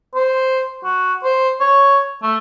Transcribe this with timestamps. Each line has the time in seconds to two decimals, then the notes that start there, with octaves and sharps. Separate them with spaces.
0.15 C5
0.84 F#4
1.24 C5
1.61 C#5
2.23 A3